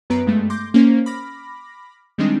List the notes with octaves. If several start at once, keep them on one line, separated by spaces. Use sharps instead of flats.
F#2 B3 B4 A#5 C7 D7
G2 G#3 A3
C6 D6 G6 A#6
A#3 C#4 C5
B5 D6 F6 A#6
D#3 G3 G#3 C4 D4 D#4